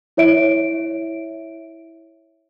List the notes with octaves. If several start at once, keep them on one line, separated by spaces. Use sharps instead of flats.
E4 C#5 E5 D7